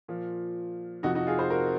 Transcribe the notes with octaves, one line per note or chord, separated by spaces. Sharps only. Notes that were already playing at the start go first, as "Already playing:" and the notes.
A#2 F3
F2 C3 F3 D#4 F#4
D#4 F#4
F4 G#4
G#4 C5
F#4 A#4